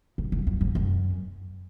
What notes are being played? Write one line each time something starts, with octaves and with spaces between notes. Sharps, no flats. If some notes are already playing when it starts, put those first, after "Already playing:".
G#2
F2
F#2
G#2
F#2